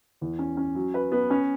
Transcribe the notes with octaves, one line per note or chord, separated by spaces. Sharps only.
E2
C#4
C#4
F#3
B4
B3
C#4